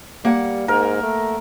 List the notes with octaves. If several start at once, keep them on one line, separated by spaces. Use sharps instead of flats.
G3 A#3 F#5
G#2 A#4
A3